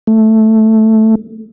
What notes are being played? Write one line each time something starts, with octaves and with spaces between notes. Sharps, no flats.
A3